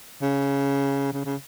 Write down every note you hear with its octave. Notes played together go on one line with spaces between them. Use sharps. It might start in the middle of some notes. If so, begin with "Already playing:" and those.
C#3
C#3
C#3